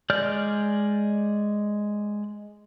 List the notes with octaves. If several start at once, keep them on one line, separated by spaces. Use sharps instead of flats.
G#3 D5 F6 G6